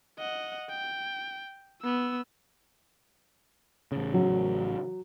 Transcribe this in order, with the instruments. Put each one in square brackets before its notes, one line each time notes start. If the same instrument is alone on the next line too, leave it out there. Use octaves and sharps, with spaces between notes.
[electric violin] D#5 F#5
G5
B3 E6
[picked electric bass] A1 C#3
[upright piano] F#3